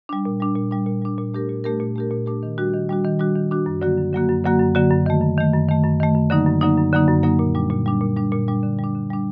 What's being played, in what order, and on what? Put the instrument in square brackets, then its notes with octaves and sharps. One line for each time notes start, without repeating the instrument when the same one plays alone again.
[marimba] G3 D4
A#2
G3 D4
A#2
G3 D4
A#2
G3 D4
A#2
A3 D4 G4 A#4
A#2
A3 D4 G4 A#4
A#2
A3 D4 G4 A#4
A#2
A3 D4 G4 A#4
D#3
G3 D4 F#4
D#3
G3 D4 F#4
D#3
G3 D4 F#4
D#3
G3 D4 F#4
F#2
D3 F#3 A#3 F#4
F#2
D3 F#3 A#3 F#4
F#2
D3 F#3 A#3 F#4
F#2
D3 F#3 A#3 F#4
F#2
D#3 A3
F#2
D#3 A3
F#2
D#3 A3
F#2
D#3 A3
F#2
D3 F#3 A#3 D#4
F#2
D3 F#3 A#3 D#4
F#2
D3 F#3 A#3 D#4
F#2
D3 F#3 A#3 D#4
A#2
G3 D4
A#2
G3 D4
A#2
G3 D4
A#2
G3 D4
D3
G3
D4
D3
G3 D4